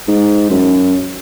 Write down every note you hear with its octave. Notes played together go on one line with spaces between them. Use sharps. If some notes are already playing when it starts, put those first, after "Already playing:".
G#2
F#2